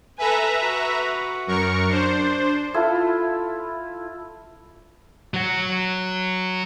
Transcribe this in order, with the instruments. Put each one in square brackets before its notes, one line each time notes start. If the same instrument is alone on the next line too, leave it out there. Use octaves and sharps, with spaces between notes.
[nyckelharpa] A4 G#5 [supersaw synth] B4 E5 A#5
[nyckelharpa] F#4
[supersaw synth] F#2 A#4 C#6
D4 C5
[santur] E4 F4 A4
[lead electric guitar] F#3 F#4